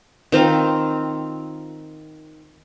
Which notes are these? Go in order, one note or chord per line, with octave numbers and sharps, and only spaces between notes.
D#3 C4 F4 F5